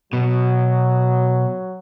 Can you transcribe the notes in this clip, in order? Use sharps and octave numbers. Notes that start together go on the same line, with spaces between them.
B2 F#3